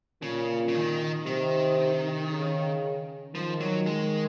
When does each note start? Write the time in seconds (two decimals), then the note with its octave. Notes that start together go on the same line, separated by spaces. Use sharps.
0.22 A#2 C#3
0.68 C#3
0.75 D#3
1.26 C3 D#3
2.31 C#3
3.34 D#3 F3
3.60 F#3
3.87 G#3